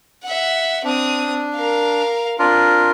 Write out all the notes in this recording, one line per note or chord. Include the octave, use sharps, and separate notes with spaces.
E5 F#5
C4 D4 D#6
A#4 F5
C4 D4 F4 A#4